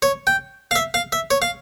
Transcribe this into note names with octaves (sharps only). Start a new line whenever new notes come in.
C#5
G5
F5
E5
F5
E5
C#5
F5